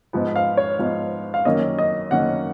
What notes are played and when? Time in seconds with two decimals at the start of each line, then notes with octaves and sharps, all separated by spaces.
0.13 G#2 F3 B3
0.36 F5
0.57 C#5
0.79 G#2 F3 B3
1.34 F5
1.45 F#2 D#3 A#3 C#4 D#5
1.78 D#5
2.11 F#2 D#3 A#3 C#4 F#5